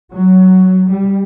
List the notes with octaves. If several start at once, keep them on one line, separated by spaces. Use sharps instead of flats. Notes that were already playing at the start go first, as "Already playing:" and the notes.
F#3
G3